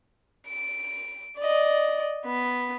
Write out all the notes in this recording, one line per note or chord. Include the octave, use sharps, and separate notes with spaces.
D7
D5 D#5
B3